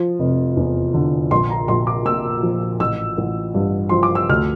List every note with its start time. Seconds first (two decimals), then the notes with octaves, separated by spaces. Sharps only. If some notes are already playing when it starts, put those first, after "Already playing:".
Already playing: F3
0.19 F1
0.57 E2
0.94 D3
1.31 A#1 C6
1.50 A#5
1.68 A#1 C6
1.87 D6
2.06 A#2 E6
2.43 F3
2.80 A1 E6
3.18 A1
3.55 G2
3.89 F3 C6
4.03 D6
4.15 E6
4.29 D2 F6